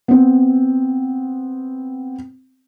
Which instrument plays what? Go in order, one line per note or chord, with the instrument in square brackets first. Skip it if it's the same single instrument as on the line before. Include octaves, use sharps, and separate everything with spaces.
[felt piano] B3 C4